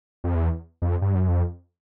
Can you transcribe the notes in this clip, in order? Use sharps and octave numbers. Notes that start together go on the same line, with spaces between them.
F2
E2
F2
G2
F#2
F2